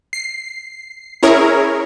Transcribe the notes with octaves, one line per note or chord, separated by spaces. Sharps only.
C7
C#4 E4 G#4 A#4 C#5